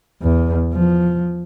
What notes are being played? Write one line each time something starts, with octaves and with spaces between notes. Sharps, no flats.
E2
F3